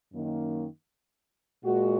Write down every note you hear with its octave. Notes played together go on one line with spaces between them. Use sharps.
F#2 D#3 A#3
A#2 G#3 F#4